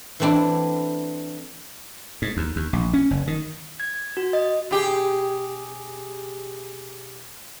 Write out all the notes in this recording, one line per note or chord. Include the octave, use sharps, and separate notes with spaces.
E3 A3 C4 D4 E4
G#2
D#2
D#2
A#1
C#4
F#1
D#3
G#6
F#4
D#5
B2 G4 G#4